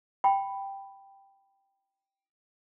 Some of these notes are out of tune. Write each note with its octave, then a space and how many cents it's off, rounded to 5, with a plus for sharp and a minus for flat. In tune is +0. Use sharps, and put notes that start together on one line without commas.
G5 +0 B5 +0